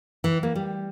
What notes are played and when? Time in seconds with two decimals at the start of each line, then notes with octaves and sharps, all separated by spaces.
0.24 E3
0.43 A#3
0.55 G3